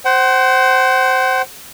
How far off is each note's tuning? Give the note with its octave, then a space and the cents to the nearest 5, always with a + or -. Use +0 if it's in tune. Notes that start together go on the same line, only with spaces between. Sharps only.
C5 +0 F#5 +40